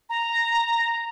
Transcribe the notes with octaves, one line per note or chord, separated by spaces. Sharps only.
A#5